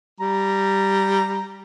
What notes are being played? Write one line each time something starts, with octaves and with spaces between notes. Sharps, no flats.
G3 A#5